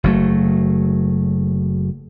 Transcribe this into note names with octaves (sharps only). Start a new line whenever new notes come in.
F#1 F#3 A3